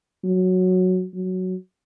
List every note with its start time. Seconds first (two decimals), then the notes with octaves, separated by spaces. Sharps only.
0.24 F#3
1.14 F#3